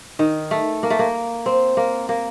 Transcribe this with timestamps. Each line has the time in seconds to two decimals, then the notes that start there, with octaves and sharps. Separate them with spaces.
0.19 D#3
0.51 A3
0.83 A#3
0.90 A3
0.99 A#3
1.46 C4
1.77 A#3
2.09 A#3